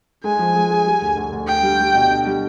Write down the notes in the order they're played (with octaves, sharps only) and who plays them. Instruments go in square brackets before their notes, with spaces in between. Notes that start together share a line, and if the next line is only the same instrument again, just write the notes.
[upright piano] G#3 [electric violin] G#5
[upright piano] F3
G#3
G#4
G3
D2
D2
D2
[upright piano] D4 [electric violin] G5
[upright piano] G3
G3
B2
D4
G3